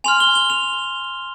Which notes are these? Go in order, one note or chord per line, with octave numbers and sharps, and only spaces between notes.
G#5 C6 F6 F7
G7
G7
F7